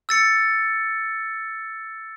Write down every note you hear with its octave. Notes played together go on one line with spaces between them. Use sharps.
E6 A6 C#7